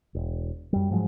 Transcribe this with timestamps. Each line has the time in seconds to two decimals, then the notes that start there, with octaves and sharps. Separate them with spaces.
0.15 E1
0.73 F#2 G3
0.91 G#2 F3 F#3 G#3